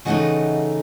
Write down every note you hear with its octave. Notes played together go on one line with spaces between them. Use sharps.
C#3 E3 A3 D#4 D#5 F#5